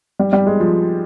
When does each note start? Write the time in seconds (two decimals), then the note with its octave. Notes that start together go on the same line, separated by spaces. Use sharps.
0.19 G3
0.33 G3
0.47 G#3
0.60 F3